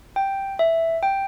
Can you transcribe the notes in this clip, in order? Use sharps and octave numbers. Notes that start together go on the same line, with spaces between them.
G5
E5
G5